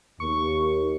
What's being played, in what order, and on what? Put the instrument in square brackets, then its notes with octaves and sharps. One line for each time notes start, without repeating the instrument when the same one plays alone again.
[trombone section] D#2 [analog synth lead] C#6